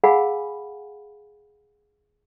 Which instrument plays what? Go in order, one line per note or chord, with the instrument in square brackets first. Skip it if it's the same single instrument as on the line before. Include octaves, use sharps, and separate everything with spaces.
[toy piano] G#4 A#4 F5 F#5 G#5 B5